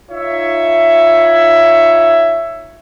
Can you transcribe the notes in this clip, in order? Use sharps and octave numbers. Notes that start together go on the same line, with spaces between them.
D#4 F4 C#5 E5